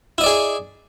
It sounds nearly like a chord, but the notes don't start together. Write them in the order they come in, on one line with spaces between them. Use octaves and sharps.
E4 D#5 D5 G#4